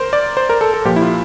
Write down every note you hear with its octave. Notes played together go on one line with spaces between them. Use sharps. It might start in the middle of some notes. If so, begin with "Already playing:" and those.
Already playing: A#4 C5
D5
C5
A#4
A4
A4
A#2 F3 G4
E4
F4